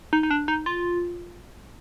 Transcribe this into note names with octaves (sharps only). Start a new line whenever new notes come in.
D#4
D#4
D4
D#4
F4